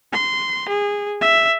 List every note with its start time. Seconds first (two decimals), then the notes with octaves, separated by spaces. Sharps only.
0.13 C6
0.69 G#4
1.22 E5